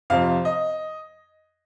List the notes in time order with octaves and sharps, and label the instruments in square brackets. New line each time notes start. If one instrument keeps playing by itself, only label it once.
[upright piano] F2 C3 F3 C4 F5
D#5